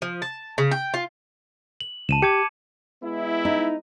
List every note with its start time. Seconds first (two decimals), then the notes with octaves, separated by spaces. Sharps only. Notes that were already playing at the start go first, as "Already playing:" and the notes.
0.02 F3
0.22 A5
0.58 C#3
0.71 G5
0.94 F4
1.81 F#7
2.09 C#2 A5 D#7 E7
2.22 G4 D6 G#6 C#7
3.03 G#3 B3 E4
3.45 D#4